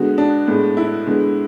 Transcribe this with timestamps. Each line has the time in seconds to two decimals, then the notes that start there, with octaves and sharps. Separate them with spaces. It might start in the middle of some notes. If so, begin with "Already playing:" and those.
Already playing: D3 G#3 B3 F#4
0.18 D4
0.47 A2 G#3 B3
0.77 E4
1.06 D3 G#3 B3